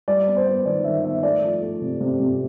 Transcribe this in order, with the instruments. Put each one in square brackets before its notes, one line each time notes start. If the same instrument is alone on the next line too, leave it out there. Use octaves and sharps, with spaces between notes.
[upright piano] G3 D5
B3
C5
B3
D#3 D5
D#3 E5
B3 E5
A3 D5
F3
A3
C3
C3
C3